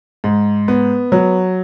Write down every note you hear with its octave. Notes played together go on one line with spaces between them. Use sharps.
G#2
B3
F#3